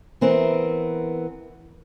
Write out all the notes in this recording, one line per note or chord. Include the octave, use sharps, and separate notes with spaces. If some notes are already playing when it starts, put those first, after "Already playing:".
E3 B3 C4 A#4